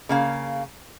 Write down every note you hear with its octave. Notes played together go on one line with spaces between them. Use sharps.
C#3 A#3 F5